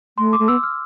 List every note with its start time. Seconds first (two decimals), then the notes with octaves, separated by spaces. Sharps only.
0.18 A3 C6
0.33 D6
0.39 A3
0.48 B3 E6
0.63 F6